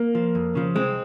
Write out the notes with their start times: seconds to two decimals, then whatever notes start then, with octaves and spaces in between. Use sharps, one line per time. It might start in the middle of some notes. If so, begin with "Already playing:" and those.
Already playing: A#3
0.15 F3
0.35 F2
0.55 C#3 F3
0.75 C2 G#3 C4